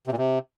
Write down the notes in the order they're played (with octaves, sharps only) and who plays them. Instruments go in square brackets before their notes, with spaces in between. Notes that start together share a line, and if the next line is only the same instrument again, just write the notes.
[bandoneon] C3
A#2
C3